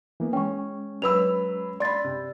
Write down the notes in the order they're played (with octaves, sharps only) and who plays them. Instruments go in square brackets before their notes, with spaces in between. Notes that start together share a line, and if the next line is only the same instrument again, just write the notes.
[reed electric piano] E3 A#3 B3
[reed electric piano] G#3 C#4 [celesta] G5 C#6
[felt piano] F#3 B5 E6 [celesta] B4 F7
[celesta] D5 A6 [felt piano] B5 C6
[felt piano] C3